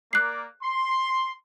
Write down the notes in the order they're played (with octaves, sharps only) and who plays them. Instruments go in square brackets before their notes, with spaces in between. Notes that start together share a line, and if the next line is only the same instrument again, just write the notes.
[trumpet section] A#3 A#4 D5 [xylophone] F#6 C7
[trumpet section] C6